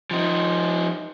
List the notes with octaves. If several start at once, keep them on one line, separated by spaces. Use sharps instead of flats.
F3 D#4